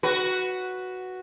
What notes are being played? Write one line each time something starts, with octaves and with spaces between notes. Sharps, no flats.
F#4 B4